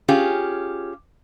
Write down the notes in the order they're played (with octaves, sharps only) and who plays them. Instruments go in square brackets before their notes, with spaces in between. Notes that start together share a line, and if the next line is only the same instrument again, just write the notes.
[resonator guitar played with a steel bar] C#4 F4 G4 G#4